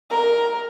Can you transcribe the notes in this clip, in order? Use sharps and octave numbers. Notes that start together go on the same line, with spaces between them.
A#4